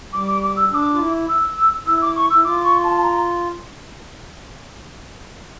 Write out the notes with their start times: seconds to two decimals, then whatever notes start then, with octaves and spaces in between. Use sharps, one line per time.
0.13 G3 D6
0.27 D6
0.42 D6
0.56 E6
0.71 D4 D6 E6
0.93 F4
0.99 E4
1.28 E6
1.86 E4 E6
2.01 D6
2.15 C#6
2.29 E4 E6
2.44 F4 D6
2.64 C#6
2.83 A5
3.03 A#5